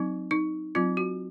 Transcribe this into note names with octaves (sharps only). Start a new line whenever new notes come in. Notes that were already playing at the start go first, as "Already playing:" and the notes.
Already playing: F#3 C4 D#4
D#4
F#3 C4 F4
F#4